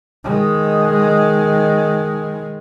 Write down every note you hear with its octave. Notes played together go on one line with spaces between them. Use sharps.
D#3 G#3